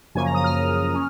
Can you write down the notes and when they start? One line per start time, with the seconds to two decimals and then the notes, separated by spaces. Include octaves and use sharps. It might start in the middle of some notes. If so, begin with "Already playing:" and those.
0.15 F#2 C#3 F3 A#3 C#4 G#5
0.25 A#5
0.34 D#6
0.44 F6
0.94 C#4